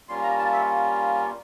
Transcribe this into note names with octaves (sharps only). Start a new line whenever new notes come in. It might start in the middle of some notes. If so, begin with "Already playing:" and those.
G3 A#3 C#4 F4 C6
A#5
A5
E5